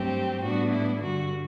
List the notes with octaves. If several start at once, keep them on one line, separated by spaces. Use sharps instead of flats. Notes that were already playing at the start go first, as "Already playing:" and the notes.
Already playing: G2 F#3 A3 C4 G4
A2 G3 B3 D4 F#4
E4
G2 D3 G3 F#4